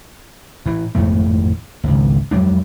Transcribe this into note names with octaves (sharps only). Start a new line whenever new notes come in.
A2 E3
G#1 F2 A2 A3
G#1 C#2
F2 F#3 G#3 D4